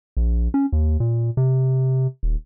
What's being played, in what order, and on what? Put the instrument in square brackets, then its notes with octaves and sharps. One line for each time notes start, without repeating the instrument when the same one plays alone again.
[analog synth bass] A#1
C#4
D#2
A#2
C3
D#1